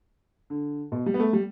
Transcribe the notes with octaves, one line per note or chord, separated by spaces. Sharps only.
D3
B2
G3
B3
A3
G3